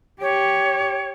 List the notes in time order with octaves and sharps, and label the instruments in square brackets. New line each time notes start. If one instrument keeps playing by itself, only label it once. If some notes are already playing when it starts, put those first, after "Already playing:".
[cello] G4 [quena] C#5